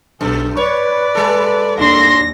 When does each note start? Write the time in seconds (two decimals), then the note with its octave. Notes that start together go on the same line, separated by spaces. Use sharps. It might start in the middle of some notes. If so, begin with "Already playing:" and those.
0.21 B1 F#2 A4
0.57 B4 C#5 D5
1.15 G3 A4
1.78 D#2 D4 C6 A#6